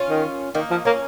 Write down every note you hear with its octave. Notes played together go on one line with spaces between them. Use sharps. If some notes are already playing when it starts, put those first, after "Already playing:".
Already playing: C#4 F4
D#3
D#3 A#3 D#4
F3
A#3 C#4